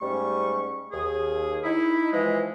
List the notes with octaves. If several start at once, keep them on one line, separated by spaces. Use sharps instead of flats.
G#2 G3 A3 C#4 C#6
D#2 G#4
D#4 E4
E3 F3 G#3